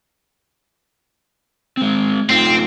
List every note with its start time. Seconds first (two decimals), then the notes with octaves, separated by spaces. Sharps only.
1.77 G#3 C4
2.30 A3 C4 D#4 F4